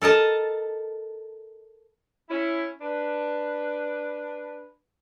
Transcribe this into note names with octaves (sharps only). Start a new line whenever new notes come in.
A4 A#4 D#5 A5
C#4 E4
D4 B4